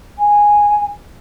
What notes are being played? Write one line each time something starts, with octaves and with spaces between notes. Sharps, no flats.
G#5